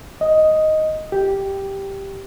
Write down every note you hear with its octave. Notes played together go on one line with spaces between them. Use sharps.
D#5
G4